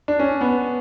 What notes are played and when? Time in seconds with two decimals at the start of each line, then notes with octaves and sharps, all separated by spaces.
0.08 D4
0.19 C#4
0.41 B3